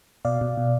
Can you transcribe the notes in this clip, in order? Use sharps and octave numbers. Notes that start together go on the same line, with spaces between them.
B2 D5 F5
B2
B2